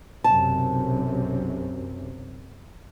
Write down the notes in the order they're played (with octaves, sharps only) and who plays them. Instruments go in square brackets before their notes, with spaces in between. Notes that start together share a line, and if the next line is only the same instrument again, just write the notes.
[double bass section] B1 F#2 C3 [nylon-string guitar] A5